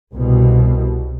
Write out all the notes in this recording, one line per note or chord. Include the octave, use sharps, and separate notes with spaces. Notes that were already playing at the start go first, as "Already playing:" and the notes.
C2 B2